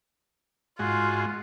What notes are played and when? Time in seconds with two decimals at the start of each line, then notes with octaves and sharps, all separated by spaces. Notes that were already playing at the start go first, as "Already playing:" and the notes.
0.79 G#2 G#3 F4 F#4